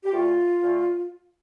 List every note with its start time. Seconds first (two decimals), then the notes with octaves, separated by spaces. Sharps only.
0.04 G4
0.12 D2 D3 A3 F4
0.61 D2 D3 A3